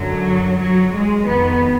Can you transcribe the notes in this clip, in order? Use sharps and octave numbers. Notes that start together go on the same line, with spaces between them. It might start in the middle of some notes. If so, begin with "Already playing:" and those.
Already playing: F#2 D3 F#3
F#3
G#3
F2 D#3 B3